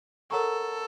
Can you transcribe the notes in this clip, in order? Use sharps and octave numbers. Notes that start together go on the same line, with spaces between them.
A4 A#4 C#5 F#5 A#5 C#6